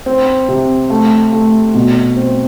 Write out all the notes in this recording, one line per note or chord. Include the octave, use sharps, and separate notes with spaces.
C4
C3
A3
A3
B2
C4